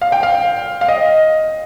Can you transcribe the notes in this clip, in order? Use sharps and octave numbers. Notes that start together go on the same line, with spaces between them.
F5
G5
F5
F5
D#5